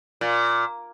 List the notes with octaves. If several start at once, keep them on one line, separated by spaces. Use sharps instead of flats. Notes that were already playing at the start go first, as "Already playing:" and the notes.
A#2